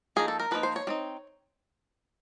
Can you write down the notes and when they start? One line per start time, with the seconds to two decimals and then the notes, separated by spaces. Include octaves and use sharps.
0.16 F3 A#3 D#4 G#4
0.28 A4
0.39 A#4
0.51 F3 A#3 D#4 B4
0.63 C5
0.76 C#5
0.87 G3 C4 D#4